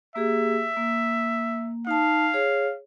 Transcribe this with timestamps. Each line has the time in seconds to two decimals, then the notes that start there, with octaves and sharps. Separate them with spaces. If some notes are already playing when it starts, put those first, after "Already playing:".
0.16 A#3 G4 G#4 E5
0.77 A#3
1.87 D#4 F5 A5
2.34 G#4 C#5